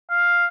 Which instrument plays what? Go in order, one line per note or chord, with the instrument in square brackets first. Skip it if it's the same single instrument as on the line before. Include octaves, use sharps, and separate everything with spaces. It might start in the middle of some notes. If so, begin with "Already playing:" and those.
[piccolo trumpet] F5